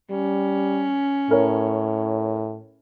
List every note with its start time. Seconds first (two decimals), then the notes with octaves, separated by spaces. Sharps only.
0.11 G3 C#4
1.31 A2 A#4 C#5